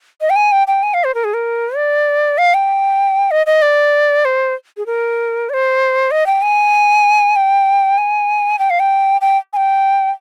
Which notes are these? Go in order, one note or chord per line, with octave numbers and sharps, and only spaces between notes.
D#5
G5
G#5
G5
G5
G#5
F5
C5
A#4
G#4
A#4
D5
F5
G5
D#5
D#5
D5
C5
G#4
A#4
D5
C5
D#5
G5
G#5
G5
G#5
G5
F5
G5
G5
G#5
G5